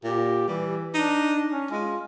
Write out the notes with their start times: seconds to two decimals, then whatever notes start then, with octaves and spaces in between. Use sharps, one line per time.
0.04 A#2 G4
0.48 E3 G3
0.94 D4 D#4
1.51 C#4
1.71 G#3 F4